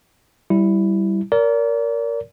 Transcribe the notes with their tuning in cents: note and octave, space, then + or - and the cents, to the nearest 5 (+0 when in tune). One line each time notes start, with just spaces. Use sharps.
G3 -15 E4 +0
A#4 +0 D5 -40